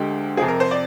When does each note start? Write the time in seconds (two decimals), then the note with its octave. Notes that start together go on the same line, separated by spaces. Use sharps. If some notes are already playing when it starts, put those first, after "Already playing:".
Already playing: D2 D3 G#3 G4
0.37 F2 C3 F3 C4 G#4
0.48 A#4
0.60 C5
0.71 D5